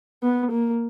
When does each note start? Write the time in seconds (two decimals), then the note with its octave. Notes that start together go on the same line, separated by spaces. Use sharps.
0.23 B3
0.52 A#3